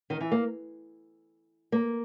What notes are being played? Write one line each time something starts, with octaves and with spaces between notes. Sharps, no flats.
D#3
E3
A#3
A#3